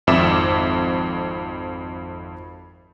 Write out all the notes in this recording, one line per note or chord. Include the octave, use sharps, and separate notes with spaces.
G#1 F2 E5 D6 E7